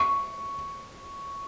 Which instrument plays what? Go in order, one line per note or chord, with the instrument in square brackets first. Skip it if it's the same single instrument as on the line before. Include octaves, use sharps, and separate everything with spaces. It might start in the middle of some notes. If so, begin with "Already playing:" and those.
Already playing: [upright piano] C#6